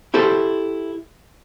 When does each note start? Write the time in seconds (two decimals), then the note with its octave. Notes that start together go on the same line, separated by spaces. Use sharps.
0.14 E4 G4 A4 C5